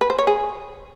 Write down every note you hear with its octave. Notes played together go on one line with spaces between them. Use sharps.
B4
C5
C#5
G#4